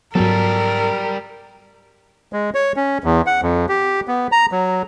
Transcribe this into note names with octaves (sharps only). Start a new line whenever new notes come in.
G#2 F#3 G3 B3 A4 A#4
G#3
C#5
C#4
E2
F#5
F2
G4
B3
A#5
F#3